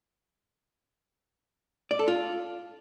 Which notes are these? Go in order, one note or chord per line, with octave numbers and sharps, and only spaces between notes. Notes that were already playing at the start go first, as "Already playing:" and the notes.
D5
A4
F4